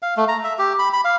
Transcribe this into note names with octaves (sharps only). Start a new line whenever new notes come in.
F5
A3
A#5
E5
G4
B5
B5
F5